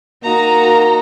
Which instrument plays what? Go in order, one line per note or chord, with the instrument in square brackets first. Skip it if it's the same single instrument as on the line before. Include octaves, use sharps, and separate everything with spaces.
[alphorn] A#3 [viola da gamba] D#4 F#4 [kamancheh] A#5